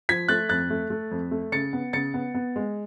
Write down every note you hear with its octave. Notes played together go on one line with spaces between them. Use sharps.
F3 G#6 B6
A3 F#6 A6
F2 F#6 A6
A3
A3
F2
A3
C#3 A6 C#7
B3
C#3 A6 C#7
B3
B3
G#3